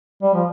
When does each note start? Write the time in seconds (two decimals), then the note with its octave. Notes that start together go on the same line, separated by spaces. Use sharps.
0.23 G3
0.34 F3